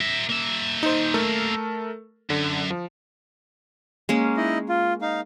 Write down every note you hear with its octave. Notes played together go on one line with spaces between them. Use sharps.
A#4 E5
A#3 E5
D#4 C5
A3 A4 A#4
F#2 D3
F3
G#3 A#3 C#4
D#4 E4 D#5
F4
D#4 F5